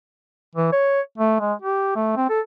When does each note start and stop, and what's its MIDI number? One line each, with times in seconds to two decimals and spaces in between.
0.55 0.70 52
0.72 1.01 73
1.18 1.39 57
1.40 1.53 56
1.62 1.93 67
1.96 2.12 57
2.17 2.27 60
2.30 2.40 69